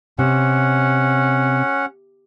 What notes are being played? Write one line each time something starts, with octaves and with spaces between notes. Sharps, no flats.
C3 C#4 F#5